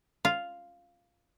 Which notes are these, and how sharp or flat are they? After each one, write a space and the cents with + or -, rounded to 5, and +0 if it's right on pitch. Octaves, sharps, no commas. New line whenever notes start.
F4 +0 F5 +0